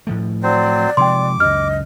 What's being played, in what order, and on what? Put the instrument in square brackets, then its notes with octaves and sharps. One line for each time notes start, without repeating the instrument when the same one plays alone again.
[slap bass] A2 F3 A3
[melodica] F#3 C4 C5 [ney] D5
[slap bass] C3 F3 G#3 [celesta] G5 C6 [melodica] D6
[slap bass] C#2 F#2 [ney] D#5 [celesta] F6